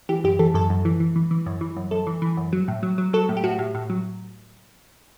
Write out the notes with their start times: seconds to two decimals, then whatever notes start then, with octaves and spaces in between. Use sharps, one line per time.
0.09 E3 G4
0.24 F#2 G4
0.39 E3 A4
0.54 F#2 A4
0.70 F#2
0.85 E3
1.00 E3
1.16 E3
1.31 E3
1.46 F#2
1.61 E3
1.76 F#2
1.91 F#2 A4
2.07 E3
2.22 E3
2.37 F#2
2.53 F#3
2.68 A2
2.83 F#3
2.98 F#3
3.13 F#3 A4
3.29 A2
3.37 G4
3.44 A2 F#4
3.59 A2
3.75 A2
3.90 F#3